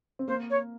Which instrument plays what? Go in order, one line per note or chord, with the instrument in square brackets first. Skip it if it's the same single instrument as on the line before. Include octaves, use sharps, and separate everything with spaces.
[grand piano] C4
[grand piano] A#3 [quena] C5
[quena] C#5